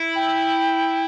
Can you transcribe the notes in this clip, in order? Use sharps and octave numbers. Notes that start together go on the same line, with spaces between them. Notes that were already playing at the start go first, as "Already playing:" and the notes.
Already playing: E4
G5